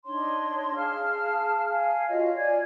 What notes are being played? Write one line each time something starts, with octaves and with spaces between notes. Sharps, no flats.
D4 D#4 C#5 C6
G#4 F5 A5 F6
F5 G#5
F4 F#4 C#5 D#5
D5 G#5 G#6